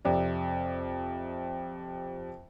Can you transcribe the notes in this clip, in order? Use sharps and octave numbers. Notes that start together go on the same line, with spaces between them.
F2 C3 D5